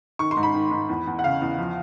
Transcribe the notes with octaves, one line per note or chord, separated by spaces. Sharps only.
D#3 C#6
C6
G#2
B5
D#3
G#2
E2
E2
F#5
C#3 F5
E2
F3